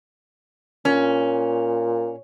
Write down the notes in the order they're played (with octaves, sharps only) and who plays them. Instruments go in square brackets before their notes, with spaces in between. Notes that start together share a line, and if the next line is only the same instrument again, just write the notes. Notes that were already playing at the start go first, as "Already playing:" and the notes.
[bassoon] A#2 [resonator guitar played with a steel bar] C#4